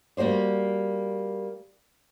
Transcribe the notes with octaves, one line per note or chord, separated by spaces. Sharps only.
G3 A#3 F#4 C5 D5